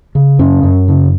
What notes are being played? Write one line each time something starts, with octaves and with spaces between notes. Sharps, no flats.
C#3
F#2 C#4
F#2
C#3